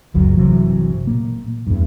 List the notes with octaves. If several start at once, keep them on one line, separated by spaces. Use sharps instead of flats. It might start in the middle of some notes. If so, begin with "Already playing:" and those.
F#1 C#2 F#2 F#3
G1 C3 E3 F#3
A#2 A#3
E2 G2